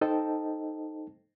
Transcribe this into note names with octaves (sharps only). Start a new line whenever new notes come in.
D#4 A4 C5 D#5 G5 A5